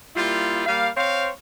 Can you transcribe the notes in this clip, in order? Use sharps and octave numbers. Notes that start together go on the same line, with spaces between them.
G3 A#3 E4 F4
G3 A#3 F5
C4 C5 C#5 F5